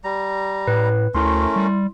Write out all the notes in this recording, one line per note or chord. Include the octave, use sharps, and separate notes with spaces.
G3 A#5
A2 B4
D2 A3 C#4 E4 A#4 C6
G3